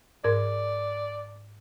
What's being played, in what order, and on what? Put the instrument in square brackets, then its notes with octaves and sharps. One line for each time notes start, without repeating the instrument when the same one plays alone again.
[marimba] G#2 A#4 G#6 [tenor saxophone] D5